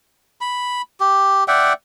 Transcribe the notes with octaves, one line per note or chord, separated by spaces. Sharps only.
B5
G4
D5 E5 F#5 G5